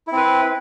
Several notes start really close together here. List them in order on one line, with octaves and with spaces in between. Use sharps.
E4 C4 B4